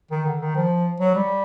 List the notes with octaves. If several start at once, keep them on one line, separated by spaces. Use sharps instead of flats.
D#3
D3
D#3
F3
F#3
G3